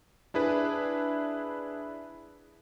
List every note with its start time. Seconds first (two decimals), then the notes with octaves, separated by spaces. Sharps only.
0.34 D4 E4 G#4 B4